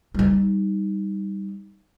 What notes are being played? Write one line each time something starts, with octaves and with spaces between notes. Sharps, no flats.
G3 D#4